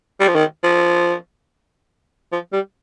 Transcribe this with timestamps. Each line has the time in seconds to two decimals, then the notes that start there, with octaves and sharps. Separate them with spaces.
0.20 G3
0.28 F3
0.35 D#3
0.63 F3
2.32 F3
2.53 G3